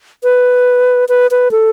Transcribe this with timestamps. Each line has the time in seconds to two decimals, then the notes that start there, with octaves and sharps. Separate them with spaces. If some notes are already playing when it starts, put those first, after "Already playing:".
0.23 B4
1.09 B4
1.31 B4
1.51 A4